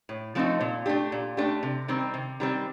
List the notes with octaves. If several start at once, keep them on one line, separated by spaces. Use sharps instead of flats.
A2
F3 A3 C4 D#4
A#2
A3 D4 G4
A#2
A3 D4 G4
C3
D#3 G3 C4
C3
D#3 G3 C4